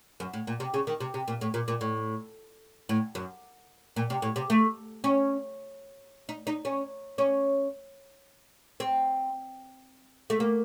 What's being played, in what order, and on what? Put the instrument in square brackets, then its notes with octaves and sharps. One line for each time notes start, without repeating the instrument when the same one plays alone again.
[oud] F#2
A2
A#2
C3
C#3
D#3
C3
C3
A#2
A2
A#2
A#2
A2
A2
F#2
A#2
C3
A2
C3
A3
C#4
D#4
D#4
C#4
C#4
C4
A3
A#3